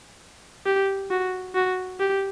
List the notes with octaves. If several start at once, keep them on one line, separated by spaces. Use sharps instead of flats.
G4
F#4
F#4
G4